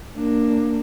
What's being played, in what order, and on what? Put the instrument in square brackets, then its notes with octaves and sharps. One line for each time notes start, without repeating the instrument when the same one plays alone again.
[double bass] A#3 D4